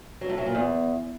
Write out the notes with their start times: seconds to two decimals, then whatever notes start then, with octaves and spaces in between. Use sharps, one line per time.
0.21 F#3
0.30 A2
0.38 F#3
0.46 A#2
0.55 E2